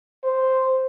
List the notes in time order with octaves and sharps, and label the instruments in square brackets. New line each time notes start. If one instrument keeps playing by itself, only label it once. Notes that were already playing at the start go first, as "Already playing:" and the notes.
[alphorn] C5